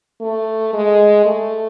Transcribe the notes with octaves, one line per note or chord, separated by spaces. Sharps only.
A3
G#3
A3